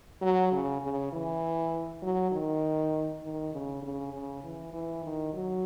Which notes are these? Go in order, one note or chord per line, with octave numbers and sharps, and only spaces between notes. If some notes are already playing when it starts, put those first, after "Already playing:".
F#3
C#3
C#3
E3
F#3
D#3
D#3
C#3
C#3
C#3
E3
E3
D#3
F#3